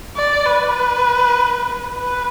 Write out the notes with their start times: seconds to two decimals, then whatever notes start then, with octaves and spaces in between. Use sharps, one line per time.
0.17 D5
0.46 B4
1.95 B4